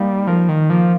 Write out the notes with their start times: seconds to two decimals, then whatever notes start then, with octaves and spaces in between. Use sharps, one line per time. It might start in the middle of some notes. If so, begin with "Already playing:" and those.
Already playing: G3 A#3 D#4
0.27 F3 A#4
0.49 D#3
0.70 F3 A#3